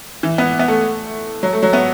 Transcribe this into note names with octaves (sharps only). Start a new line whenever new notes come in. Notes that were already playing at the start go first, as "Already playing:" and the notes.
E3
B3
B3
A3
F#3
A3
F#3
B3